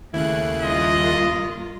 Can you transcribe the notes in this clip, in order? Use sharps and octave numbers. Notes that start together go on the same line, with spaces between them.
D#2 C#3 A3 E4 F#6
G2 A#3 F4 D#5